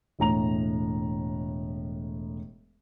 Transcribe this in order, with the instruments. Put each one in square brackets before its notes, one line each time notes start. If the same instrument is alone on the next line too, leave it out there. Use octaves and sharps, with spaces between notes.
[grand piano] E1 A2 A#5 F7